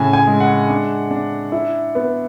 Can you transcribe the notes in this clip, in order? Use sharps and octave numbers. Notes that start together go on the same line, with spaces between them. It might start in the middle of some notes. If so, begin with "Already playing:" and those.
Already playing: A2 C#3 G#5
G#5
G#3
F#5
D4
D4
E4
B3